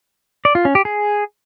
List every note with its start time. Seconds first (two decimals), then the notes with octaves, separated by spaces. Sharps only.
0.45 D5
0.55 F4
0.65 C#4
0.75 G4
0.85 G#4